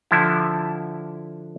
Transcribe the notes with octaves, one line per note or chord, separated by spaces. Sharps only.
D3 F3 E4